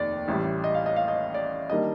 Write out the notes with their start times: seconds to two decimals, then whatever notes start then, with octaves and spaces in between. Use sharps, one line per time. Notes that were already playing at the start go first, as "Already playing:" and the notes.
Already playing: F1 D#2 D5
0.28 A1 A2 G3
0.64 D#5
0.74 F5
0.86 D#5
0.96 F5
1.08 D#5
1.34 D5
1.70 D#3 G3 A#3 D4 D#5